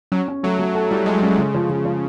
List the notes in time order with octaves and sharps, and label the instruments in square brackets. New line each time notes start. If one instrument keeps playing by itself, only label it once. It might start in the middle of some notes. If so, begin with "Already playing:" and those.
[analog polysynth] F#3 [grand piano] C#4
[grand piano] C#4
[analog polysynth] F#3 [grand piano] A3
[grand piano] A3
A4
[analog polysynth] G3 [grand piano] E4
[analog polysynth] G#3 [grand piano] A4
[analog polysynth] G3 [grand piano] C#4
[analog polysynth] C#3 [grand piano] G#3
[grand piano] F3
F3
F3